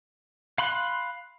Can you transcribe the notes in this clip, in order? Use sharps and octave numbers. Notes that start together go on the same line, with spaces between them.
F5 B5 C6 F#6